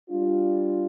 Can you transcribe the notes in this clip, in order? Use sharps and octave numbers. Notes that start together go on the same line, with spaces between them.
G3 D4 F4